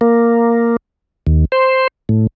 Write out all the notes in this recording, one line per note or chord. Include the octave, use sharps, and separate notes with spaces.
A#3
D#2
C5
A2